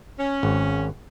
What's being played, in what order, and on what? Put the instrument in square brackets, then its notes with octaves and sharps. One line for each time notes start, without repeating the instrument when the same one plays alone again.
[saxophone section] C#4
[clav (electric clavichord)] G#1